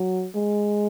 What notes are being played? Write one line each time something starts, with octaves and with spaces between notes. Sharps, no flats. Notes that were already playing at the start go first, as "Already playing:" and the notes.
Already playing: F#3
G#3